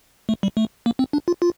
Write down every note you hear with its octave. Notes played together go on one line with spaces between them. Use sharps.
A3
G3
A3
A#3
C4
D4
F4
F4